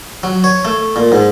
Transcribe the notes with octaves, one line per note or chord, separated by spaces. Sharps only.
F#3
C#5
A3
A#2
G#2